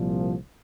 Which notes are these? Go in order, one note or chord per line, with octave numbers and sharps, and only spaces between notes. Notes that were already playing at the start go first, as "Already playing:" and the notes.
Already playing: C2 A#2 F3